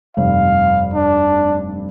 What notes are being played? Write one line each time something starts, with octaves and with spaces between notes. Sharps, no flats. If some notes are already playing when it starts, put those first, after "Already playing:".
F1 G2 F5
D4